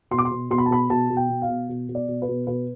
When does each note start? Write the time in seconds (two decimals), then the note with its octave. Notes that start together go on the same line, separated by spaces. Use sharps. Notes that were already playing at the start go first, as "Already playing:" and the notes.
0.11 B2 C6
0.18 D6
0.25 C6
0.31 B2
0.50 B2 C6
0.58 B5
0.66 A5
0.71 B2 B5
0.90 B2 A5
1.10 B2
1.17 G5
1.30 B2
1.42 F5
1.49 B2
1.69 B2
1.89 B2
1.95 D5
2.08 B2
2.22 B4
2.28 B2
2.47 B2 B4